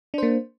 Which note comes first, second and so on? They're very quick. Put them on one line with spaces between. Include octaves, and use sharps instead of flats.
D4 C5 A#3